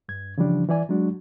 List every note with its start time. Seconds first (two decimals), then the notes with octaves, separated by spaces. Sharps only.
0.09 G2 G#6
0.38 C#3 E3 F3 G3 D4
0.69 E3 E4 D5 G#5
0.89 F#3 G#3 D4 F#4